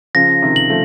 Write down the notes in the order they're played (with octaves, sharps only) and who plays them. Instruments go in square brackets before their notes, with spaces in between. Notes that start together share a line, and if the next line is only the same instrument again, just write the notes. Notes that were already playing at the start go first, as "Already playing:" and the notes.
[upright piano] C#3 F3 [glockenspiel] A#6
[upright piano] C3 D#3
[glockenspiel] F#7
[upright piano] F3 A3